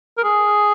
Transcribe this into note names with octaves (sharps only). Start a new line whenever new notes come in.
A#4
G#4